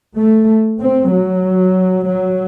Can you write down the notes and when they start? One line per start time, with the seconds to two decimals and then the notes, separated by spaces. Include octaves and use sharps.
0.15 A3
0.80 C4
1.11 F#3
2.08 F#3